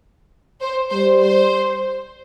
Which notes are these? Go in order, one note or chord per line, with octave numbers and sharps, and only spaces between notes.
C5
G3 C5
C5